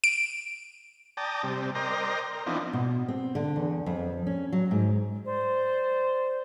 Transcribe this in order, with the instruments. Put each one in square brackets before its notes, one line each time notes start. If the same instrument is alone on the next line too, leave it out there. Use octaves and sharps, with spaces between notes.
[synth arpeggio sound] D7
[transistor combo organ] D5 G5 A5 A#5 D#6
C3 G3
A#4 C5 D5 D#5 G5 A#5
A#4
E3 F3 B3 C4 D4 D#4
[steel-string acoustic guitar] B2
C4
D3
E2
F2
C#4
F#3
G#2
[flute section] C5 D5